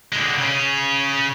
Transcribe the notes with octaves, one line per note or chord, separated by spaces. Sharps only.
D3 G#3
C#3 C#4